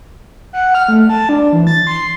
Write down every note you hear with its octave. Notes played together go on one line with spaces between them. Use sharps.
F#5
F6
A3
A5
D4
E3
A6
C6